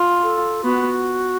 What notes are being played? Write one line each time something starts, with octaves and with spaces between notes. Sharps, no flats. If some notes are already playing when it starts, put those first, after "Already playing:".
Already playing: F4
A4
B3 F#4